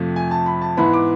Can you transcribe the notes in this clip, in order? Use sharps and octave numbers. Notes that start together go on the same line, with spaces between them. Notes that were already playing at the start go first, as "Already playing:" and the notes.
Already playing: F2 C3 F3 A3
G#5
A5
B5
A5
G#2 E3 B3 E4 B5
D6